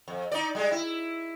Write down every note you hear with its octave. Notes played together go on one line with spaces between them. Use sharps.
F2
D#4 D5
G3 G#3
E4